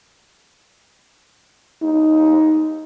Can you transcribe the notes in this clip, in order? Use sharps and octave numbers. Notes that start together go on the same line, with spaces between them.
D#4